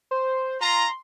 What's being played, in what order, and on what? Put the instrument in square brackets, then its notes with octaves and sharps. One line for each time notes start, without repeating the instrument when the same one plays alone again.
[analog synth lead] C5
[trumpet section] F4 A#5 [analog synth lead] C6